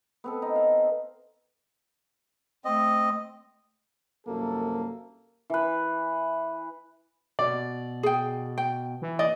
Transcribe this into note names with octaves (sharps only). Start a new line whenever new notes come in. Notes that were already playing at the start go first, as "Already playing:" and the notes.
B3 C4 A4
D#4
F5
A3 C4 D#5
C2 F#2 A#3 A4
E3 B4
B2 D5
G#4 G5
G5
E3
D5 D#5